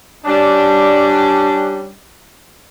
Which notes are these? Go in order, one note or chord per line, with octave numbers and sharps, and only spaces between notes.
G3 C#4 D4